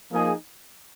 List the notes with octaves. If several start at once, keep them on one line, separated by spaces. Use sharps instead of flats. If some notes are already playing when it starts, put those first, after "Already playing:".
F3 A#3 D#4 G#4